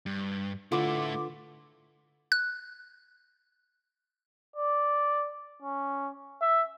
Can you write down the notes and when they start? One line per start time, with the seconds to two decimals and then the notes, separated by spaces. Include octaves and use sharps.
0.06 G2
0.72 D3 A3 E4 F4 B4 D5 C6 D6
2.32 F#6
4.56 D5
5.62 C#4
6.42 E5